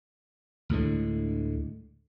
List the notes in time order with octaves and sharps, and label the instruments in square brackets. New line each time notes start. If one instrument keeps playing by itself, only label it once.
[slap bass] D2 A2 D3 G#3